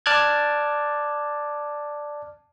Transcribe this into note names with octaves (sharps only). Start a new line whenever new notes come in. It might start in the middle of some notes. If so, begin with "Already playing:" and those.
D5 A5 D6 F6 F#6 G#6